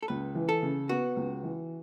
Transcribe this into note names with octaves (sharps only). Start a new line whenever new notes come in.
A4
C#2 B4
E3
A4
C#3
B3 F#4
C#2
E3